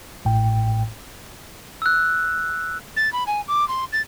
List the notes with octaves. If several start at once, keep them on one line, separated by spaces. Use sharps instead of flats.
A1 A2 G5
E6 F#6
A6
B5
G#5
D6
C6
A6